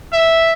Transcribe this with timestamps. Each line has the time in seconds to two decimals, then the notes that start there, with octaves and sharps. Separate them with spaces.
0.13 E5